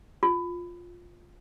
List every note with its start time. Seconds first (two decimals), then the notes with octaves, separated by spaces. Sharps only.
0.23 F4